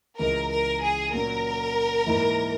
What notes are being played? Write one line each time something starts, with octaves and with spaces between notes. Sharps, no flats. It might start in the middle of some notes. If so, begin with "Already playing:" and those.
C#2 C#3 E3 A#4
A#4
G#4
A#2 F#3 C#4 A#4
G#2 E3 A#3 E4